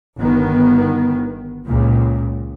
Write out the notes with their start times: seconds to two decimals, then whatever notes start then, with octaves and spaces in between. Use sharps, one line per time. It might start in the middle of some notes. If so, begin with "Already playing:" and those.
0.17 G1 D#3 B3
1.66 C#2 A#2